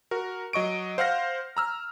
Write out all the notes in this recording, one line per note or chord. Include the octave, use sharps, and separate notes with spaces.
F#4 A#4
F#3 D#5 C#6 D7
C5 F5 F#5 F6 A#6
A#5 E6 F6